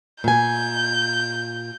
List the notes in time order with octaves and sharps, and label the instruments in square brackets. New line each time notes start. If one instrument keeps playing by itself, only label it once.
[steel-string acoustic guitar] A#2 G#5 [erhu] G6